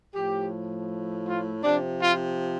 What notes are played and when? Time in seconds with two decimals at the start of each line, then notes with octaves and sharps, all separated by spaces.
0.13 A2 F3 G4
1.25 F4
1.63 C3 F3 D4
2.00 F4